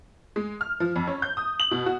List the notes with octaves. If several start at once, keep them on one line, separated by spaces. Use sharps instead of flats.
G#3
F6
F3
F2
C#4
G6
D#6
F#7
B2
F#4